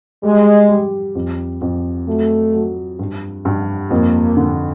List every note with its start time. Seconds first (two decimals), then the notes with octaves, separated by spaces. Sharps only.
0.23 G3 G#3
0.69 G3
1.15 F2
1.61 F2
2.07 F#3 A3
2.54 F#3
2.99 G2
3.45 G2
3.91 F2 A#3
4.37 D3